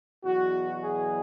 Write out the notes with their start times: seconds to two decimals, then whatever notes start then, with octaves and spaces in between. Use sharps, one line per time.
0.24 E2 B2 F#3 F#4
0.83 G#4